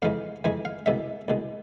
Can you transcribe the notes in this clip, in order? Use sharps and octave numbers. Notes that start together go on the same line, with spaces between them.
F2 E3 G#3 F5
F2 E3 G#3 G#5
F5
C2 B2 G#3 E5
C2 B2 G#3